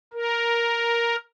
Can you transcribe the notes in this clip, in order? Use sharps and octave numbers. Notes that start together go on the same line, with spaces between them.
A#4